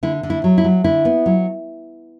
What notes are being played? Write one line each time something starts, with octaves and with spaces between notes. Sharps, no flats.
D3 E4
D3
E4
F#3
E4
F#3
D3 E4
B3
F#3